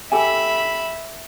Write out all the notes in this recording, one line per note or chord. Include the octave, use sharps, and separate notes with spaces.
G4 A4 E5 G#5 B5